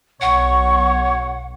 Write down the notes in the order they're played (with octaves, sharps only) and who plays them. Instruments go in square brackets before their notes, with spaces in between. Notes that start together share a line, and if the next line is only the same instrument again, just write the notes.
[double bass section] B1 [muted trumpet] C#5 [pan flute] F#5 [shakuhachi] C#6